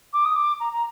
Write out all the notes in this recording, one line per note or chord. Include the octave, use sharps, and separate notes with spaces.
D6
D#6
D6
A#5
A#5